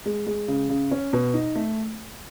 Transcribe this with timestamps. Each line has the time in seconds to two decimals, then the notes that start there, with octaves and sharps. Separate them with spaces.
0.06 G#3
0.27 G#3
0.48 C#3
0.69 C#3
0.91 C#4
1.13 B2
1.34 D#4
1.55 A3